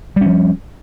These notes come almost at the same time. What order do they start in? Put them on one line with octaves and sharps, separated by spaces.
G3 C#4 F3